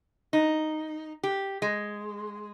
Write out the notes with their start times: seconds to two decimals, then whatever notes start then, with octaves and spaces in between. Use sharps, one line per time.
0.33 D#4
1.23 G4
1.62 G#3